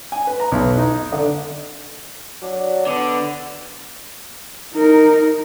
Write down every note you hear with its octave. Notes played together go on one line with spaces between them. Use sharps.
G#5
B4
A#5
B1
D#4
D3
F#3 D4
D3 B3
D#4 A#4